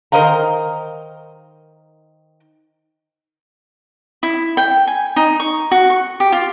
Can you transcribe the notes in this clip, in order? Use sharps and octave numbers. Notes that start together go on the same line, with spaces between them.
D#3 A#4 C5 D#5 F5 A#5
E4
G5
G#5
D#4
C#6
F#4
C#6
G4
F4